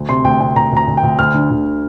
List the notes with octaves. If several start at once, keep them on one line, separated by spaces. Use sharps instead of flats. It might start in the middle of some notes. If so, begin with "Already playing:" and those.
Already playing: D2
C3 C6
D2 G5
C3 G5
D2 A#5
D2 A#5
D2
G5
D2
D2 F6
D3
D2